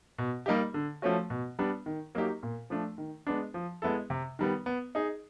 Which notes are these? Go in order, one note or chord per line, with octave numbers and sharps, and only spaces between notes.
B2
G3 A#3 D#4 G4
D3
F3 A3 C#4 F#4
B2
G3 B3 D4
D#3
F#3 A#3 D#4 G4
A#2
F3 A3 D4
D#3
G#3 B3 D4
F3
G#3 B3 E4 A4
C3
D#3 G3 B3
B3
D#4 G#4